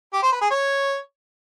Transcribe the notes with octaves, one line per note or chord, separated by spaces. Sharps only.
G4
C5
B4
G#4
C#5